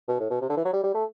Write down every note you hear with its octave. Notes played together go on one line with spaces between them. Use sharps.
B2
A2
B2
C3
D3
E3
F#3
G3
G3
A3